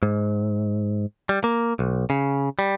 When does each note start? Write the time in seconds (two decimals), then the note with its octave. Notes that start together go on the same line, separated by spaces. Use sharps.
0.03 G#2
1.29 G3
1.44 A#3
1.79 B1
2.10 C#3
2.59 G3